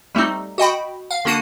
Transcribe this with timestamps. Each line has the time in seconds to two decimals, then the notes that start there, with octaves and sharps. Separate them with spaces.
0.15 G3 A3 C4 D#4
0.58 F#4 D#5 G5 B5
1.11 F5
1.25 D3 A#3 F#4 C7 D#7